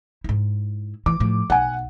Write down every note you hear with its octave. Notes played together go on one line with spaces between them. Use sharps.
G#2 E4
E3 D6
A2 F3
B1 F#5 G#5